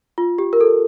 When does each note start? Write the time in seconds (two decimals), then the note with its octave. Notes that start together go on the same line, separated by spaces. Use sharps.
0.18 F4
0.38 G4
0.53 A#4
0.61 A4